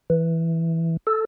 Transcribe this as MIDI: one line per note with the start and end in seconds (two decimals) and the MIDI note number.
0.10 0.97 52
1.07 1.25 69